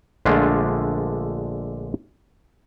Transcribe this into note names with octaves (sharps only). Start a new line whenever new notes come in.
A#1 D3 G#3 A3 D4 F4